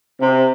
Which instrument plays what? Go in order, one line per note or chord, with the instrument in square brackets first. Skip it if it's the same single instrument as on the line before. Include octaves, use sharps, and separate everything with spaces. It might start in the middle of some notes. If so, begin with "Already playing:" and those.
[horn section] C3